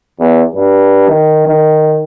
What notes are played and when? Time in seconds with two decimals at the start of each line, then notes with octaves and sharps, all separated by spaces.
0.19 E2
0.54 G2
1.08 D#3
1.47 D#3